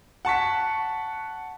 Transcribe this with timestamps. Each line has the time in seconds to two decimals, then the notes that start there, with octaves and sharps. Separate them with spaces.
0.25 F#5 A5 C#6 B6